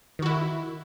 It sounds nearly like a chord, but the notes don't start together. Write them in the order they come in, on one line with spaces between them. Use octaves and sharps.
D#3 F#4 E4